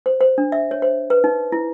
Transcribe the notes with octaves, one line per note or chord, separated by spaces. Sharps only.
C5
C5
D4
E5
C#5
C5
B4
D#4
E4